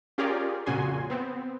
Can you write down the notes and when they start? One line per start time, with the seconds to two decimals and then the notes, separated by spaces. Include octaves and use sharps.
0.18 C#4 F4 G4 G#4 A#4 D5
0.66 F2 A#2 C#3 F#4 G#5 C6
1.10 B3 C4